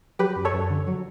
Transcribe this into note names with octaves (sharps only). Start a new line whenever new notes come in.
F#3 G4 B4
F#2
A4 C#5
F#2
D3
F#3